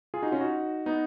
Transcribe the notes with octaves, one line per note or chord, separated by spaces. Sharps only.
F4 G#4
D#4 F#4
C#4 F4
D#4 F#4
B3 D#4